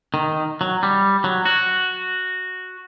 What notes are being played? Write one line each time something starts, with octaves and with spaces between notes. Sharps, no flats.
D#3
F#3
G3
F#3
F#4